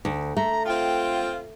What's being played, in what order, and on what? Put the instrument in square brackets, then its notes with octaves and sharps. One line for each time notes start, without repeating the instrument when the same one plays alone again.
[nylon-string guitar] D2
[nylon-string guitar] A3 [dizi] A#5
[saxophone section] C4 F4 [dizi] G5